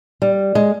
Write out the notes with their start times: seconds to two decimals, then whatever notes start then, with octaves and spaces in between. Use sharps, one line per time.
0.22 G3
0.55 G#3